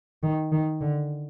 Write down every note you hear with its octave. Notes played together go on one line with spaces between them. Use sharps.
D#3
D#3
D3